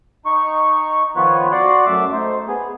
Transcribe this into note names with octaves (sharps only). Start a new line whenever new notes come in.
D#4 C#6
D#3 F3 B3 F4 B4 C#5
F#4 D5 F#5 C6
F#2 A3 E5 D6 E6
A3 D#4 C5
B3 G#4